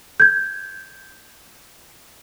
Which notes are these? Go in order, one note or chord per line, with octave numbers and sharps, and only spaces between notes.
G6 G#6